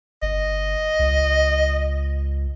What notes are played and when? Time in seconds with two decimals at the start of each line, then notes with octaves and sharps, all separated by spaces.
0.22 G1 D#5
0.99 C#2